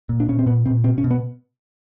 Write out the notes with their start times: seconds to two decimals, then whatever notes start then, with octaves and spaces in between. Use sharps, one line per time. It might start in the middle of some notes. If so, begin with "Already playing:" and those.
0.09 A#2
0.20 D4
0.29 A#2 C#4
0.39 C4
0.46 A#2 B3
0.66 A#2 C4
0.84 B2 C4
0.98 C#4
1.04 B2
1.11 B3